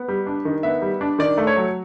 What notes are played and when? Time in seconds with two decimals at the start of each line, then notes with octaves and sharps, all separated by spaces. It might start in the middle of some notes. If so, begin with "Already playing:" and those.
Already playing: B3
0.08 G3
0.27 D4
0.45 D#3
0.63 B3 E5
0.82 G3
1.01 D4
1.19 D#3 D5
1.37 A3
1.47 C#5
1.56 F#3